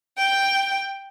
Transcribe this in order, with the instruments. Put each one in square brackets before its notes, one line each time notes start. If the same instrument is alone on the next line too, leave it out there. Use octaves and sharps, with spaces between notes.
[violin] G5